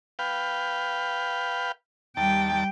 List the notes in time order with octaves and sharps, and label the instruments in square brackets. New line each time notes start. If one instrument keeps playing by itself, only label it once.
[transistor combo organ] B4 F5 G5
[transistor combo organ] D#2 A5 [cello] G3 G5